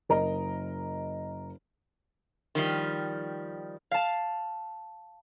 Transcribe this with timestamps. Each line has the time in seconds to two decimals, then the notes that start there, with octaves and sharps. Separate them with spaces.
0.09 F#1 A#4 D#5 A#5
2.55 D#3 F3 G3
3.91 F5 A5